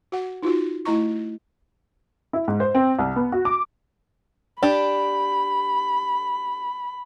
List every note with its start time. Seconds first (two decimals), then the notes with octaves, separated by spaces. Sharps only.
0.12 F#4 F#5
0.43 D#4 F4 F#4
0.85 A3 E4 D#5 A#5 C#6
2.33 E4
2.48 G#2
2.60 C5
2.75 C4
2.99 C2
3.16 B3
3.32 F#4
3.45 D6
4.63 D4 G4 B5